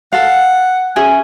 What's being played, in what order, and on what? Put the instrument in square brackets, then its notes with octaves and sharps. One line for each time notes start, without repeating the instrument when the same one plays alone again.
[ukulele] A4 F5 [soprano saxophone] F#5
[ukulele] C#4 G#4 E5 [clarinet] G#5